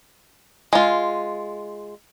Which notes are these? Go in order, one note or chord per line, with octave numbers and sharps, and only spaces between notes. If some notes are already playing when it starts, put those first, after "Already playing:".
G#3 F4